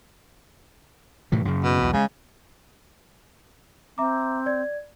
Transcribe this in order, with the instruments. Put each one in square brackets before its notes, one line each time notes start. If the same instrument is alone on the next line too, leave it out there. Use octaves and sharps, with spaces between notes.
[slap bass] A2 C3 E3
F#2 C#3
[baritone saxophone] B2
[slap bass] B1 E2
[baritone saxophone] C#3 [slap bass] G#3
[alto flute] C4 [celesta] E5 A#5 D6
[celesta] D5 G#6